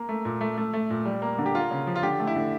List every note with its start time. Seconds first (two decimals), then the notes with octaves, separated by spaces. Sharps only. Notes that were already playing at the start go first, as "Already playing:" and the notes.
Already playing: A#3
0.09 A3
0.25 A#2
0.41 A3
0.58 A3
0.73 A3
0.90 A#2
1.05 G3
1.22 A#3
1.39 D3
1.46 G4
1.55 A#3 F4
1.71 C#3
1.87 F3
1.96 F4
2.03 D3 G4
2.20 A3
2.27 E4
2.36 D3